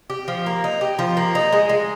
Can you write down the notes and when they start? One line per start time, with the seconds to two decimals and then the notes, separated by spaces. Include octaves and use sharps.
0.10 G4
0.28 F3
0.46 A#3
0.64 D#4
0.81 G4
0.99 F3
1.17 A#3
1.35 D#4
1.53 G#3
1.69 G#3